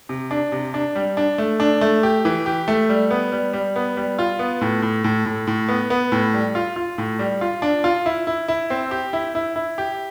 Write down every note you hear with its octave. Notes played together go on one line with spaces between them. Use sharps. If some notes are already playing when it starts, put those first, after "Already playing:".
C3
D4
C3
D4
G3
D4
A3
D4
A3
G4
E3
G4
A3
G3
B3
G3
G3
B3
G3
F4
B3
A2
A2
A2
A2
A2
B3
B3
A2
G3
F4
F4
A2
G3
F4
D4
F4
E4
E4
E4
C4
G4
E4
E4
E4
G4